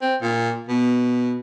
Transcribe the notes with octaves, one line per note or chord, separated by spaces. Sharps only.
C4
A#2
B2